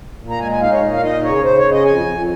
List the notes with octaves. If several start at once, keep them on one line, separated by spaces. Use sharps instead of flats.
A#2
A#5
G#3 G#5
G#5
D#4 F5
C#5
A#2
F5
D#4 D#5
C#3 C#5
C#3 C5
C#5
C#3
D#5
F2 G#5
F2